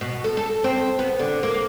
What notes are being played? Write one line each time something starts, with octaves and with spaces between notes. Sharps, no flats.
B2
A4
A4
C4
B3
D3
A#3